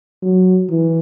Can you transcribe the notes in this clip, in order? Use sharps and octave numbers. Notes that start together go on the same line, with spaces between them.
F#3
E3